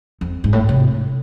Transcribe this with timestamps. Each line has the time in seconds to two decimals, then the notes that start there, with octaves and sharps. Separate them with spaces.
0.21 F2
0.44 G#2
0.53 A2
0.69 C3